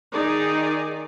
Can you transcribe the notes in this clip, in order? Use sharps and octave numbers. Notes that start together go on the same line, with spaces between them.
D#3 D#4 G#4 D5